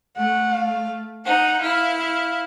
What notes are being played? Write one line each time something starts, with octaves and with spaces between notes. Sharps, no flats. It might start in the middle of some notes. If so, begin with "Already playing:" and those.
A3 F#5
F5
D#4 F#5
E4 F5
F5